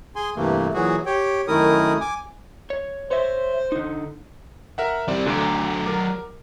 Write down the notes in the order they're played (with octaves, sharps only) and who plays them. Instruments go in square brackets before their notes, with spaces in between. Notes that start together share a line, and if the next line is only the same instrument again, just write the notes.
[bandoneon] G#4 G#5 C6
G2 C3 E3 A3 A#3
A#2 E3 F#3 F#4 G#4
G4 C#5 G5
F#2 D#3 A3 E4 A#4 D#6
G#5 D6
[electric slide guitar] C#5
[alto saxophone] C5 [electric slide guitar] C#5 E5
[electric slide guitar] D3 D#4
[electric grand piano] A#4 E5 F#5
[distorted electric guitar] G3 C4 [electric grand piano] D5
[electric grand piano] D2 D3 [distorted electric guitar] F#3 D5
[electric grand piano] A#4 D6